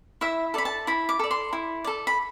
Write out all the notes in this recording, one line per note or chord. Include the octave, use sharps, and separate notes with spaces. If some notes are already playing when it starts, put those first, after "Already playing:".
E4 E5
A4 D5 B5
A5
E4 B5
D6
A4 D5
C6
E4
A4 D5
B5